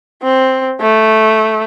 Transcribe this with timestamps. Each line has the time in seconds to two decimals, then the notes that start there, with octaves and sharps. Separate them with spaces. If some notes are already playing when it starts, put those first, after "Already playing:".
0.23 C4
0.81 A3